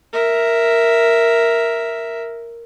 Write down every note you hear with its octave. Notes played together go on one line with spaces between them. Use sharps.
A#4 E5